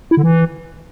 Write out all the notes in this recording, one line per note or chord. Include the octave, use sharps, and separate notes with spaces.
E4
D3
E3